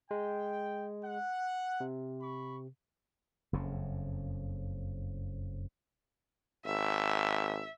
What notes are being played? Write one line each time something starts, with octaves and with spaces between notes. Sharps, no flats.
G#3 G5
F#5
C3
B5 C#6
F#1 F2 C#3
G#1 E5